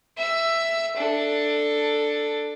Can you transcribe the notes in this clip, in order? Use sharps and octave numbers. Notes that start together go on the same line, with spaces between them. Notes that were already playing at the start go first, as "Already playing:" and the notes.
E5 E6
D4 A4